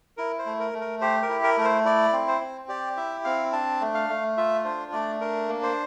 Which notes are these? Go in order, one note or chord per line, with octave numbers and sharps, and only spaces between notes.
E4 A#4
C5
A3
A#4
A3
A#4
G4 C5
A#4
E4
A#4
A3 A#4
C5
E4 D5
C4
C5
C4
G4 D5
E4 E5
C4 F5
D4 A5
A3
F5
A3
F4 E5
D4 C5
A3 D5
D4 A#4
A#3
C5